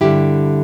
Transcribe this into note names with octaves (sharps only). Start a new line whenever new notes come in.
G2 D3 G3 E4 G4